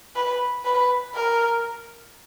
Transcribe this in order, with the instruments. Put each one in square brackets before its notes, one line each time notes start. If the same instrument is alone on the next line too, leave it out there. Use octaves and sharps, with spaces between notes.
[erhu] B4
B4
A#4